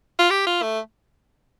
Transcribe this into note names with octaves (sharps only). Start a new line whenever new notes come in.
F4
G4
F4
A3